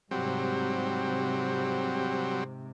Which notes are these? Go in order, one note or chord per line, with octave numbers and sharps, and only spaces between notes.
G#2 C3 F#3 G3 C4